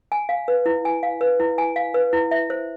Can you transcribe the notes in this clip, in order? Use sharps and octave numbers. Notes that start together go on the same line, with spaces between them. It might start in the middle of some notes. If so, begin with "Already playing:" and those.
G#5
F5
B4
E4
G#5
F5
B4
E4
G#5
F5
B4
E4
E5
C5